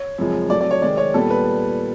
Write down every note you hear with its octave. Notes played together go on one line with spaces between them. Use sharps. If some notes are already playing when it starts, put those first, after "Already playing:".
Already playing: C#5
F#2 C#3 F3 G#3 C4
A2 F#3 A3 C4 D5
D5
C#5
C3 D#3 G#3 C4 D5
C#5
A#2 G3 B3 A4
B4